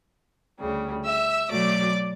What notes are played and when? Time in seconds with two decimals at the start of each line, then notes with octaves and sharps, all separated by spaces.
0.59 D2 C#3 G3
1.05 E5 E6
1.50 B2 F#3 A3 D5 D6